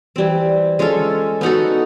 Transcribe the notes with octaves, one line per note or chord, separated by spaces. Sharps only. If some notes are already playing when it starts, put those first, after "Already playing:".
E3 G3 C4
G#3 C#4 F4 A4
B3 D#4 F#4 A4